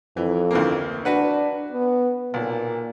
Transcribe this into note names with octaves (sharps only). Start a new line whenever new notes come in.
F2 E3
D2 E3 A#3
D4 F#4 B4 F#5
B3
B1 A#2